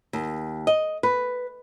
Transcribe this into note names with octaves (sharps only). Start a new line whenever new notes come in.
D#2
D#5
B4